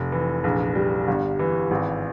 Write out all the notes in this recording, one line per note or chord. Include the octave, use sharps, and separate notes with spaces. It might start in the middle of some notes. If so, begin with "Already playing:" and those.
Already playing: F1
E3
A#1
G3
G1
E3
G#1